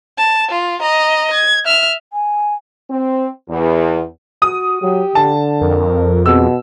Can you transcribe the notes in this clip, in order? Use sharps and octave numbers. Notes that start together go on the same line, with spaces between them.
A5
F4
D#5 A#5
G#6
E5 F6
G#5
C4
E2
F#4 D#6
F#3 G4
D3 A5
F2 A#4
B2 G#4 E6